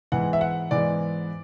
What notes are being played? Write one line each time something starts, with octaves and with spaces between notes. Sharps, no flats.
G#2 E3 G#3 B3 F#5
E5
F#5
G#2 E3 G#3 B3 D5